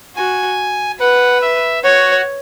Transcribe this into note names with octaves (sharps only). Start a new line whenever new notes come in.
F#4 G#5
B4 F#5
E5
F#4 C#5